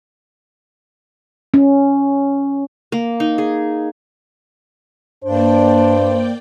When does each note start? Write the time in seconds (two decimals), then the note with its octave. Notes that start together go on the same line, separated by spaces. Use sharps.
1.54 C#4
2.92 A#3
3.20 D#4
3.38 G#4
5.24 G2 A#3 D4 C5 D5 G5